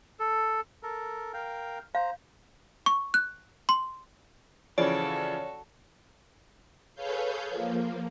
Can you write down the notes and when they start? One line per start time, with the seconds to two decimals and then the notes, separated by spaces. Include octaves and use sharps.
0.19 A4
0.83 A4 A#4
1.34 A#4 F5 G5
1.95 C5 F5 A#5
2.86 C#6
3.14 F#6
3.69 C6
4.78 C#3 E3 F3 F#4 A4 C#5 D5
6.95 G#4 A4 B4 C#5 F5 G6
7.50 F3 A#3